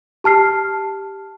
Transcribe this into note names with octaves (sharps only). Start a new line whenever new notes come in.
G4 A5 F6 C7